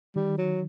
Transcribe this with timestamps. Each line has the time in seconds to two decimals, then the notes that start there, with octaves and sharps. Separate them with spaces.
0.16 D#3 G3
0.38 F#3